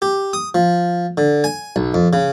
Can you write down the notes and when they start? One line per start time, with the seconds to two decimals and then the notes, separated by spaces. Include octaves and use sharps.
0.02 G4
0.33 D#6
0.55 F3
1.18 D3
1.44 G#5
1.76 B1
1.94 F2
2.13 C#3